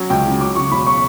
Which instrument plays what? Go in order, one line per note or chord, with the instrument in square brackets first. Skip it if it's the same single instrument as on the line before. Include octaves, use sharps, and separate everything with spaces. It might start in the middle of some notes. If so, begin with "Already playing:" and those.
Already playing: [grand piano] F#3 C#4 C#5
C#2 G5
C#3
F#3 D6
C#3 C#6
E1 B5
C#6